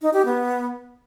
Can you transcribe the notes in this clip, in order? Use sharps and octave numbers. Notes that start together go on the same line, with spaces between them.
D#4
G4
B3